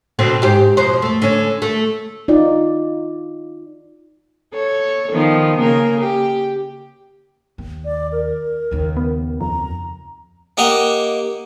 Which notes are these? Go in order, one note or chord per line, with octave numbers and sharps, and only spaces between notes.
B2 D3 C4
G#2 G4 C5
F2 B2 C5
A3
D3 C#4
A3
D#4 F4 D5
A4 C#5
D#3 F3 B3
C#3 A#3 A#4
G4
D#2
D5
A#4
D#2 C#3
B3
F2 A#5
A#3 G4 A#4 D#5 F#5